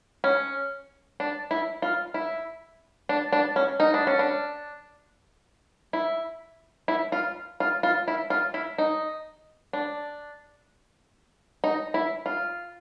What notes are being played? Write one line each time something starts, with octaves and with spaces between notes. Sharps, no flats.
C#4
D4
E4
F4
E4
D4
D4
C#4
D#4
D4
C#4
D4
E4
E4
F4
F4
F4
E4
F4
E4
D#4
D4
D#4
E4
F4